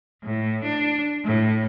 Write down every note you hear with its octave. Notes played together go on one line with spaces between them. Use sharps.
A2
D4
A2